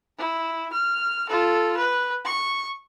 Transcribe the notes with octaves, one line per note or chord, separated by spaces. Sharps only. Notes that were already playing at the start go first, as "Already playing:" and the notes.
E4
F6
F4 A4
B4
C#6